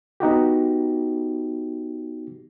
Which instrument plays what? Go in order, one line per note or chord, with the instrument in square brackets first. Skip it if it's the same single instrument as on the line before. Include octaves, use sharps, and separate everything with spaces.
[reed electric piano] B3 D#4 F#4 G4